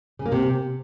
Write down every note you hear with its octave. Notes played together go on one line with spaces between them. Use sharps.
C#3
A#3
C3